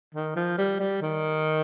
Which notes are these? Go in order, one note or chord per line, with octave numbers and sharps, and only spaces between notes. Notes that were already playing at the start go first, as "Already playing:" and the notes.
D#3
F3
G3
G3
D#3